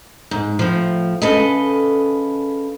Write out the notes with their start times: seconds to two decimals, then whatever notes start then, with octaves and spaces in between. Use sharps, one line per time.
0.31 G#2
0.59 A2 F3
1.22 C#3 A4 B4 D#5